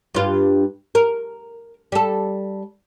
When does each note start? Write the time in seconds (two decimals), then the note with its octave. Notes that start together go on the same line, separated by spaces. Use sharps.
0.14 G2 F4
0.95 A#4
1.92 G3 A4